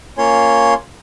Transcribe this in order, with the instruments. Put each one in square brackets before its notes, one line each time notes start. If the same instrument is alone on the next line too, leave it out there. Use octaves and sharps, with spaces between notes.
[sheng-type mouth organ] A#3 C#4 F4 C#5 C6